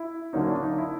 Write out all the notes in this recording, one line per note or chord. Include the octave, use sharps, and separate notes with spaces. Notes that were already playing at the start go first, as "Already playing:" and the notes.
Already playing: E4
D3 F#3 A#3 C#4 D#4
D4
D#4
E4